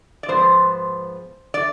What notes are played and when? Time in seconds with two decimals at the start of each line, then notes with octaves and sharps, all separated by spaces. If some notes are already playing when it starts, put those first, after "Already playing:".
0.23 D5
0.28 G#2 F3 B3 C5
1.54 D5